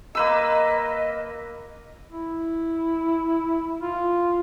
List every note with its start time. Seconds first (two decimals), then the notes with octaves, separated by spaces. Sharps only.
0.15 A#3 B4 D#5 E6
2.11 E4
3.82 F4